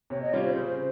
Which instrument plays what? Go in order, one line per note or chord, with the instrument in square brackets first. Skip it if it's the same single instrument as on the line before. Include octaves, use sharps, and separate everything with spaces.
[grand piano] C3 [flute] C#5
[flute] D#5
[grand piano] G3 C#4 F4 [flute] C#5
[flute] C5
[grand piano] C#3